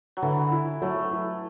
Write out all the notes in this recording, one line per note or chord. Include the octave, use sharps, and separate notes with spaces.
F#3
D3 E3
E4
F#3 A3
E4